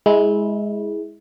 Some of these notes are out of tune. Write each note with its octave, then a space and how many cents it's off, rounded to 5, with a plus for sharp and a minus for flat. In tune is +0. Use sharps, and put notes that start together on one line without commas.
G#3 +0 E4 -20